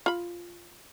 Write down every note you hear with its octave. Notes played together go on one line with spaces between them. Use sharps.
F4 B5